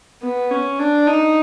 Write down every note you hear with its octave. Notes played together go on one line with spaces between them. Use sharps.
B3
C#4
D4
D#4